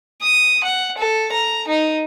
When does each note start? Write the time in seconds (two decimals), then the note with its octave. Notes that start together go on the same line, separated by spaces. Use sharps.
0.22 D#6
0.64 F#5
0.98 A4
1.32 A#5
1.68 D#4